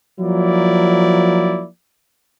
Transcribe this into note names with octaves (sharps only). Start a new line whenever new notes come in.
F3 F#3 A#3 E4 D5